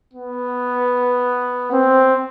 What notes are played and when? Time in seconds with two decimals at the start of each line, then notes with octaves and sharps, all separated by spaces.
0.13 B3
1.72 C4